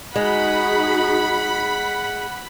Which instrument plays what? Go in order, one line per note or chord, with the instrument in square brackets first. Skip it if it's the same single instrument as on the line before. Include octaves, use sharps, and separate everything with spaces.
[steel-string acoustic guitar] G#3 [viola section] D#4 F#4 G#4 [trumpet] F#5 [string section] B5